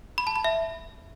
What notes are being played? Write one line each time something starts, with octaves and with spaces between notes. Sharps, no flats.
B5
A5
B5
E5